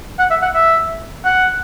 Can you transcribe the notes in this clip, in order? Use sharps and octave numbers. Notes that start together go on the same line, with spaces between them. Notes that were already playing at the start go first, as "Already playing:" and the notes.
F#5
E5
F#5
E5
F#5